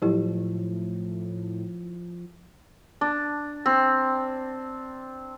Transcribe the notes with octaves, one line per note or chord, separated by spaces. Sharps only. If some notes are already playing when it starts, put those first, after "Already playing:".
A2 F3 F#3 E4 G4
D4
C4